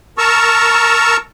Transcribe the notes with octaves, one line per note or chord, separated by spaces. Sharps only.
A#4 A5 A#5 C#6 E6